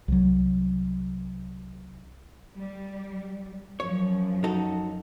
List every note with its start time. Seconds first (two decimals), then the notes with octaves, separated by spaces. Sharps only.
0.08 C2 F#3
2.57 G3
3.80 F#2 F3 C#5
4.44 D#4 F#4 A4